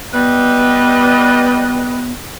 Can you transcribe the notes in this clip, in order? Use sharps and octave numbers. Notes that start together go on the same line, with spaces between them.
G3 B3 B4 D#5